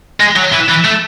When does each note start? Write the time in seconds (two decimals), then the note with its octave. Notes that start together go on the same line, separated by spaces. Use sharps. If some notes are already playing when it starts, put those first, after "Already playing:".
0.20 G#3
0.36 F#3
0.52 E3
0.68 E3
0.84 A3